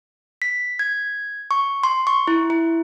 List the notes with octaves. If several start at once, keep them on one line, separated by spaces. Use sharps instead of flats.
B6
G#6
C#6
C6
C#6
E4
E4